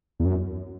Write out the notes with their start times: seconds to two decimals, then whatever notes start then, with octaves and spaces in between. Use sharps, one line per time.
0.20 E2
0.25 F#2